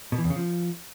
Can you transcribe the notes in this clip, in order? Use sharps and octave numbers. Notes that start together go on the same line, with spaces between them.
B2
E3
E2
C#3
F3